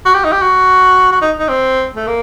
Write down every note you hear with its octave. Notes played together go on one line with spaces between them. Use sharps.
F#4
G4
D#4
G4
F#4
F#4
D#4
D#4
C4
A3
A#3